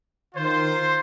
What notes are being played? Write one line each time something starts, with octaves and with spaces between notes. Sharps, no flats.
D#3 F4 C5